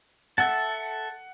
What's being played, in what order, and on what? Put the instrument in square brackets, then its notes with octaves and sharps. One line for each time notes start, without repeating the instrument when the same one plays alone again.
[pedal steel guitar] A4 E5 A5 [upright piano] F#5